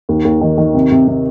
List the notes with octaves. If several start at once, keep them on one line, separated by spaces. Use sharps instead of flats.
D#2
D#2
D#3
D#3
C3
C3
C3